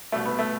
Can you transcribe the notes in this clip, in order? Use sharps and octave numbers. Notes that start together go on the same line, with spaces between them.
C2 B2 A3
B3
A3